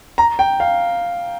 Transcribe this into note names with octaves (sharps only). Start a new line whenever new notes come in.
A#5
G5
F5